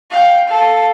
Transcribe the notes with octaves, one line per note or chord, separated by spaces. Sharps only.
F5 G5
A4 F5